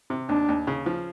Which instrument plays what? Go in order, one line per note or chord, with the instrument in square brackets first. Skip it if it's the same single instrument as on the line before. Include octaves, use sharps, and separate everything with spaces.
[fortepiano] C3
[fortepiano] D#2 [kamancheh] D4
[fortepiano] D#2
C#3
F3